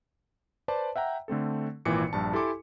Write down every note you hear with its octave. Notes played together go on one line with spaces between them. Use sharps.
B4 C5 D5 A5
E5 F#5 G5 A#5
D3 A3 C4 A4
G#1 A#2 E3 B4 D6 C#7
A#1 G2 A5
E4 G4 A4 G#5 C6 D6